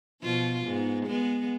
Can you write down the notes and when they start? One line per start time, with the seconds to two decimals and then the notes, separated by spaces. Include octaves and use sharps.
0.22 B2 F3 F4
0.65 G#2 B3
1.06 G#3 B3